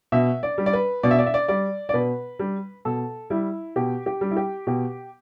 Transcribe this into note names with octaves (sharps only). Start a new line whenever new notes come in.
B2 E5
D5
G3
D5
B4
B2 D5
E5
D5
E5
D5
G3 D5
D5
B2 B4
G3
B2 A4
G3 E4
B2 G4
G4
G3
E4
G4
B2 G4